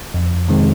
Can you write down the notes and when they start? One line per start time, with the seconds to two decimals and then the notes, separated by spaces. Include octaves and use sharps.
0.14 F2
0.48 C3 D#3 G#3 C4